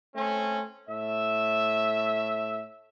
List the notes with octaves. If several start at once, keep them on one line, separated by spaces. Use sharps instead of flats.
A3 C4 C#4
A2 E5